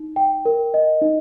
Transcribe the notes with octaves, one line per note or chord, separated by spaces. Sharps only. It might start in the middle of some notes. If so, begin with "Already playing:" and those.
Already playing: D#4
G5
A#4
D#5
D#4